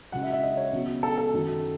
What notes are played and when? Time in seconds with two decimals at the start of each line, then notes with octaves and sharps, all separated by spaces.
0.12 C#2 C#3 F#3 F#5
0.23 E5
0.33 E5
0.43 D#5
0.57 C#5
0.72 C#2 B2 F#3
1.03 A4
1.18 A4
1.33 F#2 D#3 F#3